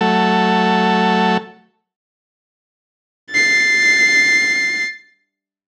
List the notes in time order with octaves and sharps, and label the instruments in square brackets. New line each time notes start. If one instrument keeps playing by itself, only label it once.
[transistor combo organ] F#3 A3 A4
[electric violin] A6 C7